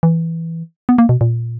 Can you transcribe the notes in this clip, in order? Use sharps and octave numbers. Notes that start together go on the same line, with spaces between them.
E3
B3
A#3
B2
A#2